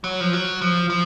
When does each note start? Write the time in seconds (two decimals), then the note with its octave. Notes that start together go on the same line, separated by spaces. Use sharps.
0.04 F#3
0.20 F3
0.33 F#3
0.61 F3
0.90 F3